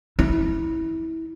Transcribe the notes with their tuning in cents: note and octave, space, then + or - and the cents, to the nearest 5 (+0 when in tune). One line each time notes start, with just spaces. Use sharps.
E4 -20